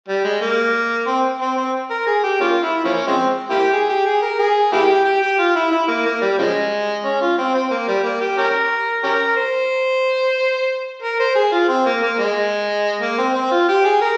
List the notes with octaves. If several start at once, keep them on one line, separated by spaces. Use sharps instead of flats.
G3
G#3
A#3
C4
C4
C4
A#4
G#4
G4
A#3 C#4 F4
E4
F3 A#3 C#4
F3 G#3 C4
A#3 E4 G4
G#4
G4
G#4
A#4
G#4
A#3 E4 G4
G4
G4
F4
E4
E4
A#3
A#3
G3
C#3 F3 G#3
C#4
F4
C4
C4
A#3
G3
A#3
G4
C#4 G4 A#4
C#4 G4 A#4
C5
A#4
C5
G#4
F4
C4
A#3
A#3
G#3
A#3
C4
C4
F4
G4
G#4
A#4